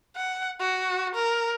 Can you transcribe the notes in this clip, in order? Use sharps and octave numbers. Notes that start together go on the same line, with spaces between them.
F#5
F#4
A#4